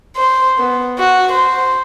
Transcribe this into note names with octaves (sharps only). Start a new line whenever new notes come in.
C5
B3
F#4
C5